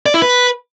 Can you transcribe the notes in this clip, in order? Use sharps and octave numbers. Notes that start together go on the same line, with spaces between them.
D5
E4
B4